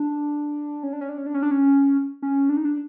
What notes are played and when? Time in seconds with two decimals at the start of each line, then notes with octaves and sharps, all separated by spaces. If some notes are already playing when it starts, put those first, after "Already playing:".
Already playing: D4
0.83 C#4
0.93 D4
1.01 C#4
1.09 D4
1.18 C#4
1.26 D4
1.34 C#4
1.43 D4
1.51 C#4
2.23 C#4
2.49 D4
2.57 D#4
2.65 D4